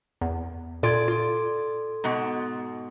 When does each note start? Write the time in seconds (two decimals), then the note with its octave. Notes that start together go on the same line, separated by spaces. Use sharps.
0.21 E2
0.83 A#2 F4 A4 D5 C6 G#6
1.08 F4
2.04 G#2 B2